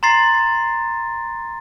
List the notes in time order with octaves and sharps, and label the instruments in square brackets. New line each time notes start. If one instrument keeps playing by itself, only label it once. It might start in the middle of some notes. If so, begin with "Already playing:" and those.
[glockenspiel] A#5 C6 A6 C7